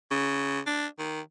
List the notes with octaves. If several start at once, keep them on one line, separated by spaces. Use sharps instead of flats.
C#3
D4
D#3